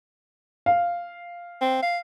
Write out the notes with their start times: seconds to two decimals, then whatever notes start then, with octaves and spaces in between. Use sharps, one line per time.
0.66 F5
1.61 C4
1.82 F5